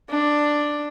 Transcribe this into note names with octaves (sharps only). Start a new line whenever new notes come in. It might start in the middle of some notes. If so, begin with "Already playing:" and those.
D4